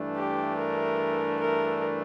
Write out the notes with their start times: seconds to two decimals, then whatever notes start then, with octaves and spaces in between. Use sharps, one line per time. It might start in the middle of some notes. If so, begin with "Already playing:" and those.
Already playing: G2 E3 A3 D4
0.15 G4
0.58 A#4
1.40 A#4